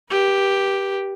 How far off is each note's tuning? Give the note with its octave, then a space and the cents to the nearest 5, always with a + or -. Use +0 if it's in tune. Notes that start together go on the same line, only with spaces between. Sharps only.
G4 +0 B4 -40